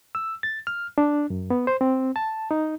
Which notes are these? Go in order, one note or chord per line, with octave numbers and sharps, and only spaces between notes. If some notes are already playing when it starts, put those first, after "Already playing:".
E6
A6
F6
D4
F#2
B3
C5
C4
A5
D#4